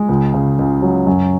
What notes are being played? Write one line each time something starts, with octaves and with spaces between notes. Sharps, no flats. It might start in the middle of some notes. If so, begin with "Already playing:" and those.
Already playing: G#3
C#2
C#3
C#2
F#3
F#2